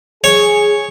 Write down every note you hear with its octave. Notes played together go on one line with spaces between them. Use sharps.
G#4 C#5